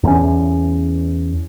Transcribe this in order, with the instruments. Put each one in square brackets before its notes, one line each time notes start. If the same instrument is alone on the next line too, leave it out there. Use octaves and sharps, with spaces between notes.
[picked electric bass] E2 B3 C#4